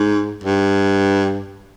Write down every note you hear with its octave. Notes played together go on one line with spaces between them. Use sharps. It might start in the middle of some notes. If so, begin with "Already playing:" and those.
Already playing: G#2
G2